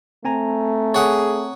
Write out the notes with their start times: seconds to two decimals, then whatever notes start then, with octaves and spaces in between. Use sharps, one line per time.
0.25 A3 C4 G#5 A#5
0.94 G#4 C#5 F#5 D#6